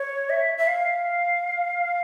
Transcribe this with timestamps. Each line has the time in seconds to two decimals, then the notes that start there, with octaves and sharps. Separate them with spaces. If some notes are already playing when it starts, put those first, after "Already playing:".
Already playing: C#5
0.30 E5
0.58 E5
0.67 F5